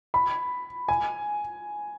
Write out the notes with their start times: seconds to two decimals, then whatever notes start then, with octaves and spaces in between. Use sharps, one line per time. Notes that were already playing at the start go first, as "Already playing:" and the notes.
0.14 B5
0.88 G#5